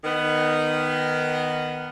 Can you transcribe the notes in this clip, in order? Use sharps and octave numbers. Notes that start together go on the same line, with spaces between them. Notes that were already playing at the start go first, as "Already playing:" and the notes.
D#3 B3